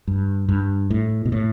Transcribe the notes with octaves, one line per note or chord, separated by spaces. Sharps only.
G2
G2
A2
B2
A2